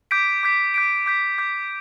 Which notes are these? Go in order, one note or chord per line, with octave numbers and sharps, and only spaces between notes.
D6 G6 B6 D7
D6 G6 B6 D7
D6 G6 B6 D7
D6 G6 B6
D6 G6 B6